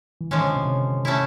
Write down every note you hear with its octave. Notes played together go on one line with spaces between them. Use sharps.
E3
A2 D#3 F3 G#3 C#4
D3
C3
A3 C#4 E4